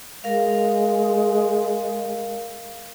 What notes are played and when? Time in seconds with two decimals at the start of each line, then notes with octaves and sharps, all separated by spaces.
0.24 G#3 A#4 F5